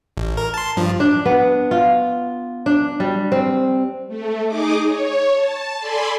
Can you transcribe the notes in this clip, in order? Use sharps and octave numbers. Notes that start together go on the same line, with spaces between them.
A1
A#4
A5 C6
G2 F3
D4
B3
F4
D4
G3
C4
A3
D#4 G#4 D#5 D6
C#5
A5
A4 D5 G#5 B5 C6